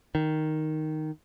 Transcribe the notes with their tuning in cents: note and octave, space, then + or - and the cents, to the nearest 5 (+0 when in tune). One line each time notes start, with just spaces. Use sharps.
D#3 +0